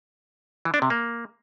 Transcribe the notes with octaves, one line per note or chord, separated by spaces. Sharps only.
E3
D4
C3
A#3